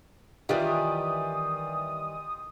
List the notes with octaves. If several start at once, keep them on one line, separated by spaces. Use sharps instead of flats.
D#3 E3 G3 F4 G4 D5 D#6